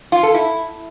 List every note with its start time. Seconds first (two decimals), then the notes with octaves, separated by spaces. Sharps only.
0.12 F4
0.23 A4
0.34 E4